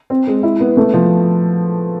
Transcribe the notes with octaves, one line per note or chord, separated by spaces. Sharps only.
C4
G#3
E4
B3
A3
F3